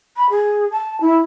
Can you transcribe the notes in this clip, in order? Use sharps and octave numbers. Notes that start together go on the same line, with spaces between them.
B5
G#4
A5
E4